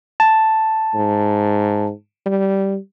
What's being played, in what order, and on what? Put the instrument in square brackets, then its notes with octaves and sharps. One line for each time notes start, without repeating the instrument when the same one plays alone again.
[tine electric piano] A5
[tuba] G#2
G3